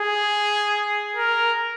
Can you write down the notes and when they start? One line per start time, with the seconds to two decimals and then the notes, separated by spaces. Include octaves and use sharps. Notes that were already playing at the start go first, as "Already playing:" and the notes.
Already playing: G#4
1.16 A#4